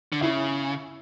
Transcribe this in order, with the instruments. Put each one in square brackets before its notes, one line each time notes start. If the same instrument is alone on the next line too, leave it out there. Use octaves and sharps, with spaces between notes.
[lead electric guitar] D3
[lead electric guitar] C#3 [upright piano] E4 E5